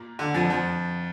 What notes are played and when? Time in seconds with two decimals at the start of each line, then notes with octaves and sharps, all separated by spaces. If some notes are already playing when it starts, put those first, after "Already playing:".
Already playing: A#2 A#3
0.19 D3
0.34 F2 F3
0.50 F2 F3